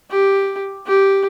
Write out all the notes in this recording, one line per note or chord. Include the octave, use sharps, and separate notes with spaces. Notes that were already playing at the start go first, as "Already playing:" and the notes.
G4
G4